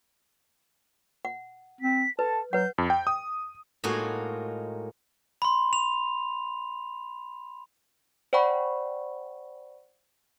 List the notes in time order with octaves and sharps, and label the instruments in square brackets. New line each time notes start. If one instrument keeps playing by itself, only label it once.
[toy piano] F#5
[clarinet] C4 [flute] B6
[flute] A4 [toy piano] B4 [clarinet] A5
[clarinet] F#3 [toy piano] B4 F#5 [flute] G6
[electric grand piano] F2
G5
D#6
[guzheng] A2 G#3 A#3 D#4 F4 F#4
[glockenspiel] B5 C6
F7
[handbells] C5 D5 F#5 G5 B5 C#6